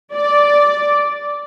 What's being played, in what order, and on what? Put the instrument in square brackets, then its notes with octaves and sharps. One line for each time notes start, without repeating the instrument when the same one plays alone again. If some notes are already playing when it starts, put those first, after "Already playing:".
[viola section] D5